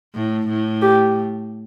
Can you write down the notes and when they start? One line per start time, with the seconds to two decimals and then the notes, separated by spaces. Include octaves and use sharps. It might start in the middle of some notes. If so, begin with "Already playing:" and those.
0.14 A2
0.48 A2
0.82 G4